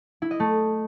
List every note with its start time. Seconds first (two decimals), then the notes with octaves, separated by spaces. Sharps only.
0.22 E4
0.31 D#5
0.40 A3